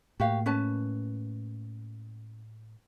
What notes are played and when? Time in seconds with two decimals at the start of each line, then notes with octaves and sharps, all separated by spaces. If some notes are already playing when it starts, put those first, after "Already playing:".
0.20 A2 A#3 F#4 G4 F5
0.46 C#4 B4 A5